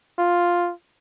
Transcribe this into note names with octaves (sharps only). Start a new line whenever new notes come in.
F4